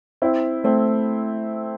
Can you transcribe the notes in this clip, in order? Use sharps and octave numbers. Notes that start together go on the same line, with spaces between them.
C4 E4
A3 C4